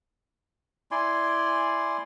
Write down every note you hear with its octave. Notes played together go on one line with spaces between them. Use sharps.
E4 D5 G#5 C6